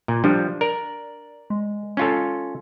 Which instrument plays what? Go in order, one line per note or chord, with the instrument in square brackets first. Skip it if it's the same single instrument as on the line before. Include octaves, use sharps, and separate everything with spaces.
[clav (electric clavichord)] A#2
[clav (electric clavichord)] F3 G3 [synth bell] D4
[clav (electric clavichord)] A#4 [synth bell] D5
[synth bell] G#3
[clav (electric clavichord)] C#4 F4 A4